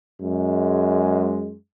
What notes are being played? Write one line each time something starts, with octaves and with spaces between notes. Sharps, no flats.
F#2 G#3